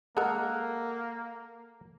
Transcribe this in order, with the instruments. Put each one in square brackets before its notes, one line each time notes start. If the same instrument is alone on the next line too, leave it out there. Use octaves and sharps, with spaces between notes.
[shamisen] G#3 A#4 [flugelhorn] A#3 [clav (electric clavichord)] A4 F#5